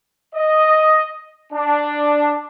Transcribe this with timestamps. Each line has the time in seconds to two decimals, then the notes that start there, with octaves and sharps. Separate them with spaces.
0.35 D#5
1.53 D4